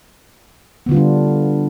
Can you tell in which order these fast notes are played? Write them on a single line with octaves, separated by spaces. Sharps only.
B3 D3 F4 G3 D4